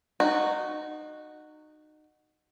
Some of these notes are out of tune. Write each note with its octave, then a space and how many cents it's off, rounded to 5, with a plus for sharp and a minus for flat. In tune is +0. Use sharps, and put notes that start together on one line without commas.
D#4 -25 F#4 +0